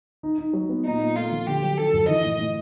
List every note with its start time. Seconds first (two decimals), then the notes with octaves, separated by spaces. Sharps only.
0.23 D#4
0.38 D#4
0.53 F#3
0.69 B3
0.85 A#2 D#4
1.00 A#2
1.16 A3 F4
1.31 F3
1.46 D3 G4
1.63 F#3
1.77 D3 A4
1.93 F#2
2.08 E3 D#5
2.23 A2
2.39 A2